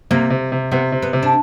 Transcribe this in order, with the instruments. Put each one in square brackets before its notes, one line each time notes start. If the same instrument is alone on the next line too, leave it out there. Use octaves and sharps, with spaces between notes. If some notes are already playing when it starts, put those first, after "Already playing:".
[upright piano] C3 [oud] A#3
[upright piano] C3
C3
[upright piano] C3 [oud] B3
[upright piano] C3
[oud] B3
[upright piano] C3
[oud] D4